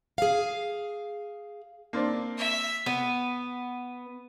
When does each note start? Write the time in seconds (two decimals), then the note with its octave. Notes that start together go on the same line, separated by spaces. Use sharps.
0.18 G#4 F5
1.93 A#3 C4 D4
2.38 E5
2.86 B3